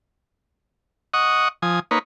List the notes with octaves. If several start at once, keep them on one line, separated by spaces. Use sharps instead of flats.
D#5 F#5 C#6 D#6
F3 G#5 D#6
A#3 D#4 B4 C#5